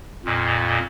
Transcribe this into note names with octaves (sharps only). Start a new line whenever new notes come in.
F2 A#2